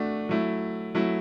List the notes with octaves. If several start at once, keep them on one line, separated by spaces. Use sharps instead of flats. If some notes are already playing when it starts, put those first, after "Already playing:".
Already playing: A3 D4 F#4
F#3 A3 E4
F#3 A3 E4